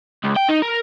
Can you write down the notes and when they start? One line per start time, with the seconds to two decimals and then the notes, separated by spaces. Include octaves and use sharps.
0.24 C#2
0.37 G5
0.49 D#4
0.62 A#4